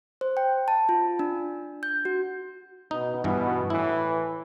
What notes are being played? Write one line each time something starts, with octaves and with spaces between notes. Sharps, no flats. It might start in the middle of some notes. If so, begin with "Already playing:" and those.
C5
G5
A5
F4
D4
G6
F#4
B2 D#4
G2 B2 E3
A2 E3 E4